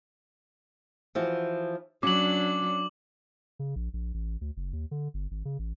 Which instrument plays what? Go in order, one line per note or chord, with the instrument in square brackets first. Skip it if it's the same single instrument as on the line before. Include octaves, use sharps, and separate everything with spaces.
[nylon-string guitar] E3 F3 F#4
[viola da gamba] F#3 D4 [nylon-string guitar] C#4 [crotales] D6 F#7
[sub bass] C#3
A#1
A#1
A1
D2
F#1
D#2
D3
G1
G#1
C#3
A1